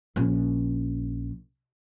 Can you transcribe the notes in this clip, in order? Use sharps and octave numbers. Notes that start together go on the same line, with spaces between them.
A#1 C#4